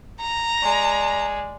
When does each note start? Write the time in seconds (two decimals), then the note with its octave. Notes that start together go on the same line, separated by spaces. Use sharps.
0.21 A#5
0.63 G#3 D5